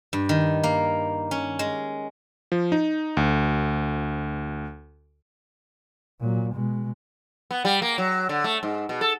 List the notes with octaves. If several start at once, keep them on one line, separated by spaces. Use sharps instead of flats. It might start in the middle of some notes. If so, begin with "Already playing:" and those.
G2
D#3
A#3
C#4
G#3
F3
D#4
D2
A#2 F#3
B2 G#3
B3
G3
A#3
F#3
D3
A3
G#2
B2
A4